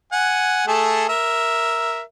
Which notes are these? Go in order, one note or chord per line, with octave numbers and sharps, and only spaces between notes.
F#5 G#5
A3 G#4 A4
A#4 E5